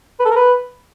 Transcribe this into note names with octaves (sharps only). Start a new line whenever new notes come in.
B4
A4
A#4
B4